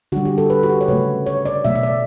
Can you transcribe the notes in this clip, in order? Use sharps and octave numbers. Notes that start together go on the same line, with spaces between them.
D3 G3 F#4
G4
A4
B4
F#4
G4
C#5
C#3 F#3 A3 B4
C#5
D5
B2 F#3 A3 E5
E5
D5